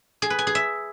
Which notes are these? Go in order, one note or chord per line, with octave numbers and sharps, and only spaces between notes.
G#4
B4
G#5
G#4
E5